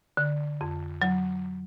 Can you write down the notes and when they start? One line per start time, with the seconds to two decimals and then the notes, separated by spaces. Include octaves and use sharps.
0.17 D3
0.61 F2
1.02 F#3